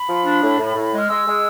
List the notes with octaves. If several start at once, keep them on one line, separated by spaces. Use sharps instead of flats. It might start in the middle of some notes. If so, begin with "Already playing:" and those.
Already playing: B5
F3
D4
A2
A2
A2
G#3
F6
G#3 E6
G#3